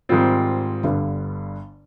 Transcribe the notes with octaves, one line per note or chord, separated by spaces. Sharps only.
G#2 D#3 G3 C4 F4
G1 G2 D3